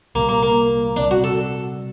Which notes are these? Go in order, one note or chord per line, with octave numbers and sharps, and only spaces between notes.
C2 A#2 G3 A#3
A#3
A#3
C3 G3 C4 D4
F#4
A4